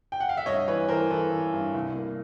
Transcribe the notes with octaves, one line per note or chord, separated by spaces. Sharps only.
G5
F#5
F5
E5
G2 C#5 D#5
E3 B4 C#5
E3 A#4 C5
E3 A4 B4
E3
G2
C2
A#3